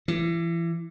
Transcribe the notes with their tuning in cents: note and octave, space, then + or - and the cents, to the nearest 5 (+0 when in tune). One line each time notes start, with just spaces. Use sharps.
E3 +30